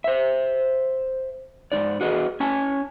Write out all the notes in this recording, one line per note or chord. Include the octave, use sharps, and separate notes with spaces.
C5 E5
G#2 C#3 D#4 D5
F#4 G#4 B4 D#5
C#4 G#5 A5